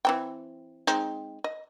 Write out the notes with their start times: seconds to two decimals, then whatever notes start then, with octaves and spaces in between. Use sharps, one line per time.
0.05 E3 C4 G5
0.87 G#3 C4 D#4
1.44 D#5